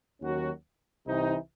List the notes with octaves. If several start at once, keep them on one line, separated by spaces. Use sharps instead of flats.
D#2 D#3 F#3 C#4 F#4
C2 C3 E3 C4 D#4